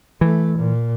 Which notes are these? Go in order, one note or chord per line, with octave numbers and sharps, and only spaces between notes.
E3 A3
A#2